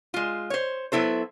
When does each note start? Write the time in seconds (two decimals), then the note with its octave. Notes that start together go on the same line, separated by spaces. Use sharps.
0.14 G#3 F4
0.50 C5 C#5
0.92 F#3 B3 E4 A4 C5